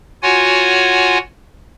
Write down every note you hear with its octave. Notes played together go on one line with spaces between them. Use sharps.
F4 F#4 C#5 F#5 G#5